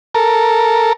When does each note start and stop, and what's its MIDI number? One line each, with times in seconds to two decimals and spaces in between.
0.15 0.93 69
0.15 0.93 70